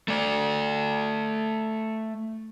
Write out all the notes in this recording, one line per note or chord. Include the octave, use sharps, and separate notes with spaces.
A3 D5